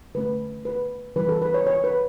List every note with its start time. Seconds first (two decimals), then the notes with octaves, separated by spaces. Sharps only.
0.15 D3 A3 C#4 B4
0.65 B4
1.16 E3 G3 C#4 B4
1.29 A4
1.42 B4
1.54 C#5
1.67 C#5
1.84 B4